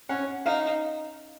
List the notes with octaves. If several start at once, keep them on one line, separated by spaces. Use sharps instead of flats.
C#4 F#5
D#4 F5